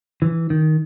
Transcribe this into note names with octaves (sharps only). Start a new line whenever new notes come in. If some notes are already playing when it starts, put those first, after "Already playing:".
E3
D#3